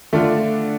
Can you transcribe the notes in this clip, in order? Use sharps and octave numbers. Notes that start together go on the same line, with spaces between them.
D3 A3 D4 F4